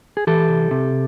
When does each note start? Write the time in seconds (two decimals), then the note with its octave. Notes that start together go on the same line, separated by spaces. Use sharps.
0.17 G#4
0.27 E3 G4 A4
0.48 C2
0.71 C3